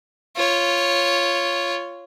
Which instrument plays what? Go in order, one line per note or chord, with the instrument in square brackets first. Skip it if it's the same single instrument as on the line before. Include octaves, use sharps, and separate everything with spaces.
[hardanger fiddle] F4 C#5